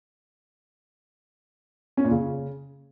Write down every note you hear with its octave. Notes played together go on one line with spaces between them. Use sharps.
C#4
A#2
C#3